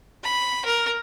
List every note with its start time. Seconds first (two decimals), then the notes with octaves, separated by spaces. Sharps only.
0.24 B5
0.65 A#4